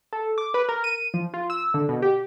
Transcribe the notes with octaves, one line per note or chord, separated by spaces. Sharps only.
A4
D6
B4
A#4
D#7
F3
F4
E6
D3
B2
G4